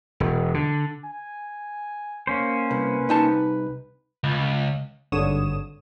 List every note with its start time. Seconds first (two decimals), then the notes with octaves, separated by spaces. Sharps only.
0.20 E1
0.54 D3
1.05 G#5
2.27 A#3 C#4 C5
2.71 C2 B4
3.09 C2 D#4 A5
4.24 C#2
5.12 G#1 G2 D3 C#5 D#6 E7